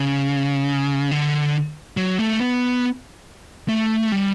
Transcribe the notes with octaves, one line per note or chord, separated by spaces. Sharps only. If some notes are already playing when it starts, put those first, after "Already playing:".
Already playing: C#3
D3
F#3
A3
B3
A3
G3